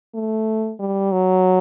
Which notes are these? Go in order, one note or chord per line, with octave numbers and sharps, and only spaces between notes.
A3
G3
F#3